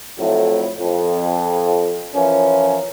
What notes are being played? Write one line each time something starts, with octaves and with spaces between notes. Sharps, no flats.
F2 A2 F#3 A3 E4
F2
E3 F3 C#4 E4 A#4